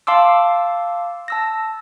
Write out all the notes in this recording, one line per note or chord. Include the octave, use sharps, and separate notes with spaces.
F5 A5 C6 D6 E6
A5 E6 A#6